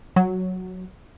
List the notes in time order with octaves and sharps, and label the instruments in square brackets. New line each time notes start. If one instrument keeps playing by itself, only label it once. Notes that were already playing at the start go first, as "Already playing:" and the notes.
[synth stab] F#3